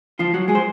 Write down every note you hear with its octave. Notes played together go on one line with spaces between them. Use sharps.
F3 F4
F#3 F#4
G#3 G#4
C5